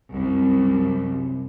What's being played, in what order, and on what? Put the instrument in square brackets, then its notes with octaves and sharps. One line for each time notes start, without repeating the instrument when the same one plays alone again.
[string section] C2 F#2